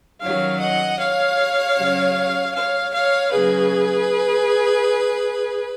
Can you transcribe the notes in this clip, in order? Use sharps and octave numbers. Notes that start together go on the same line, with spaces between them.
F#2 D#3 F#3 C#5 F5
D#5 F#5
C#5 F5
F#2 C#3 F#3
C#5 F5
C#5 F5
C#3 F#3 A#3 G#4 B4